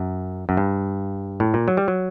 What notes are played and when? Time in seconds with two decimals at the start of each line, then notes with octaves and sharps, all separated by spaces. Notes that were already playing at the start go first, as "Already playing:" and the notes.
Already playing: F#2
0.49 F#2
0.57 G2
1.40 A2
1.54 A#2
1.68 F#3
1.77 G3
1.88 F#3